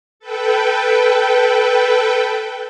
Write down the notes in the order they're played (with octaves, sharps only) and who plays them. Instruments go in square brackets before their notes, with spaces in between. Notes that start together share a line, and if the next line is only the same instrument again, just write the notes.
[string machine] A4 B4 G5